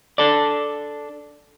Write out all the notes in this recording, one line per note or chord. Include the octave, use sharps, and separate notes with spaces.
D4 A4 D5